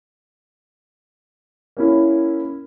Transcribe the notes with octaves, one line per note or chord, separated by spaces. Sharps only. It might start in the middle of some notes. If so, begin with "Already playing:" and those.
A#3 C#4 E4